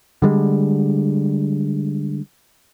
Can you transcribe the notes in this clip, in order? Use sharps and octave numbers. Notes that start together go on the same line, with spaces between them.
D3 G3 G#3